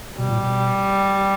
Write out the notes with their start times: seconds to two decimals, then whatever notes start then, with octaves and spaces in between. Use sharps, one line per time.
0.18 B2 G3
0.29 A#2
0.38 B2